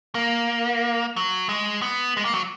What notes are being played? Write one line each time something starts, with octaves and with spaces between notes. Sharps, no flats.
A#3
F#3
G#3
B3
G#3
A#3
F#3